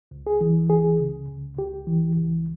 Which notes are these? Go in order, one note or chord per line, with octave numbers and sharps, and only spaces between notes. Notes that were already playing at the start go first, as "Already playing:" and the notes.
C#2
G#4
E3
C#2 G#4
C#3
C#2
C#2 G4
E3
C#2